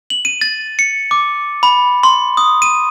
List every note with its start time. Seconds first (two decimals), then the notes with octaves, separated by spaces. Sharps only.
0.10 F#7
0.25 D#7
0.41 A6
0.79 C#7
1.11 D6
1.63 B5
2.03 C6
2.37 D#6
2.62 D#7